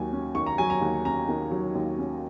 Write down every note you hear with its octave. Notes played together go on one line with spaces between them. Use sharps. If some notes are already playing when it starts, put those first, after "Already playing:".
Already playing: D#2 F#3 G#5
C#4
D#3 C#6
A#5
F#3 G#5
A#5
D#2
C#4 A#5
D#3
F#3
D#2
C#4